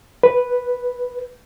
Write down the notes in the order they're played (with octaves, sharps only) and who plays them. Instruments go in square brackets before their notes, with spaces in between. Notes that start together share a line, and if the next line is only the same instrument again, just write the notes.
[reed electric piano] B4